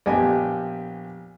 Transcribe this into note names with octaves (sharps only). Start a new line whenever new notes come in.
A#1 B3 G4 G#5